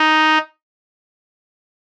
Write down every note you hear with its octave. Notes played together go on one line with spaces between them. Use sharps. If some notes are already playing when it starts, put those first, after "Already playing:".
Already playing: D#4